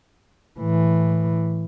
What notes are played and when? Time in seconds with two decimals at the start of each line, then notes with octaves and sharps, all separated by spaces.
0.59 A2 E3